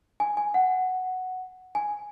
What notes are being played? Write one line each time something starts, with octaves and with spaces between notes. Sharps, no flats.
G#5
G#5
F#5
G#5